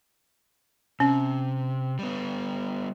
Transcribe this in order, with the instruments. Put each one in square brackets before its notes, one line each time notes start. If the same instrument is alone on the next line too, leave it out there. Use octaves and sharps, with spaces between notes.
[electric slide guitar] C3 [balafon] C#4
[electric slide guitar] G3 B3